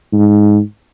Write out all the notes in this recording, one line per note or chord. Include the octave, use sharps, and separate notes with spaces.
G#2